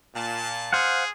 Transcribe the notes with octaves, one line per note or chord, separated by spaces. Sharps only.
A#2 A5
G#4 C5 F5 F#5